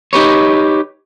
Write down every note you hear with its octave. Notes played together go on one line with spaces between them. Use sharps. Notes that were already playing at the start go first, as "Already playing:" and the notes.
D#4 G4 B4 C#5